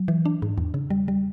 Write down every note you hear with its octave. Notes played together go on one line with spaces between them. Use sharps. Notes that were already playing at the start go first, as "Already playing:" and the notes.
Already playing: F#3
E3
D4
G#2
E2
C#3
G3
G3